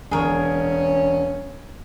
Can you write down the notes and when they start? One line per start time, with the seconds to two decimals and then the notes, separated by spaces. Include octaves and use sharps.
0.11 E1 E2 C#4 G#4 A#4 C#5